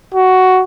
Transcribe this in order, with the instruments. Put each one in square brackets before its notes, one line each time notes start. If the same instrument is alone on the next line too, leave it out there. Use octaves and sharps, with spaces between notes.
[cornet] F#4